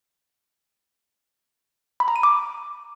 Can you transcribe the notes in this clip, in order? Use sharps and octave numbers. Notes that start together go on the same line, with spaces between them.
B5
A#5
D#7
D6